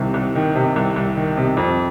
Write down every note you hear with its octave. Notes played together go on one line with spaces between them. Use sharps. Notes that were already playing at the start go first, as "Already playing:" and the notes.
Already playing: C2 C3 D#3
C2
D#3
C3
C2
C2
D#3
C3
F2